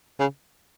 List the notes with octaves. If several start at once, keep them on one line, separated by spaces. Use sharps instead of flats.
C#3